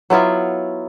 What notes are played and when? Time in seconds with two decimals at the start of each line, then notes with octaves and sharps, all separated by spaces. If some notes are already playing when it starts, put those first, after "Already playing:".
0.10 F#3 B3 E4 F4